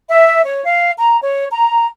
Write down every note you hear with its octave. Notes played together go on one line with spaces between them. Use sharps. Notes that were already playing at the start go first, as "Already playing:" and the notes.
E5
C#5
F5
A#5
C#5
A#5